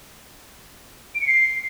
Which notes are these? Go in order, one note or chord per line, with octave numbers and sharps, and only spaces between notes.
D7
C#7
C7